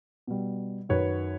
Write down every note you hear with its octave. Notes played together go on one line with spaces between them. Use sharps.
B2 G3
F#2 D#3 F#3 B4 C#5